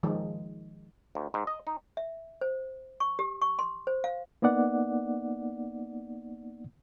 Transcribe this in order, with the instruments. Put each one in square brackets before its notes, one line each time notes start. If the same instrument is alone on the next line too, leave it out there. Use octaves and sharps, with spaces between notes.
[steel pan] D#3 F3 G#3
[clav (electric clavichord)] D2
G#2
D#5
D#4
[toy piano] E5
C5
C#6
G4
C#6
C6
C5
F5
[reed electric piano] A#3 B3 D#4 D5 F#5